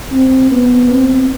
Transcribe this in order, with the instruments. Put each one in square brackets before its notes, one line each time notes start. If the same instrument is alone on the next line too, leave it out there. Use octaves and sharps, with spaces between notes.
[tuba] C4
B3
C4